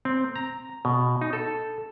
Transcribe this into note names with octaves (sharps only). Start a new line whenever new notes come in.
C4
A#5
B2
D#4
A4